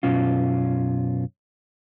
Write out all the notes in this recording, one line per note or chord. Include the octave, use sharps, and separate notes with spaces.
F#2 B2 C#4 F4